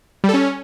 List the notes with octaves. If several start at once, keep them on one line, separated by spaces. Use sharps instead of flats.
G3
A4
C#4